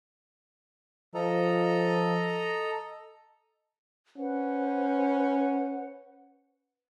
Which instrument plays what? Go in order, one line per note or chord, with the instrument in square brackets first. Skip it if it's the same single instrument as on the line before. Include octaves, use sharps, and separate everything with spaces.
[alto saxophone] F3 [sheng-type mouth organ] A4 D#5 A#5
[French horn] C#4 [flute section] B4 C5 F#5